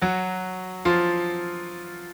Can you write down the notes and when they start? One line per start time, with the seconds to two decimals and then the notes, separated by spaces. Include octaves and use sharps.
0.02 F#3 F#4
0.85 F3 F4